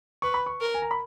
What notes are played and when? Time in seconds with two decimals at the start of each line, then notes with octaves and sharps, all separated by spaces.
0.22 B4 C#6
0.34 B5
0.46 C#6
0.61 A#4
0.74 G#5
0.82 A#5
0.91 B5